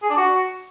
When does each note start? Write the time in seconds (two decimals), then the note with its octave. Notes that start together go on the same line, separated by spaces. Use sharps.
0.02 G#4
0.10 D4
0.17 F#4